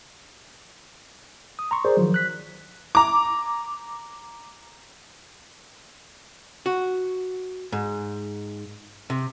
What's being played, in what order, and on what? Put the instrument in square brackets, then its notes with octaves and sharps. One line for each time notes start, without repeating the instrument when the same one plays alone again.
[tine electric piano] D#6
A#5 C6 C#6
G#4 A#4 C5 D5
D#3 F3 F#3
F#6 B6
[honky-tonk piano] A#5 D6
[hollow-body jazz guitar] F#4
G#2
C3